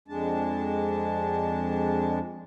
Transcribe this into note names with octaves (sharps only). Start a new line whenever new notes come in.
F2 G#3 D4 A5